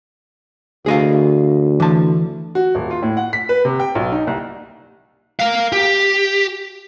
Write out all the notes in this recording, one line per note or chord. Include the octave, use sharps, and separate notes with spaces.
D2 G#4 D#5 F5
E3 A5
F#4
D#1
F4
A2
F#5
B6
B4
C3
G5
B1
D#4
C2
A#4 F5
G4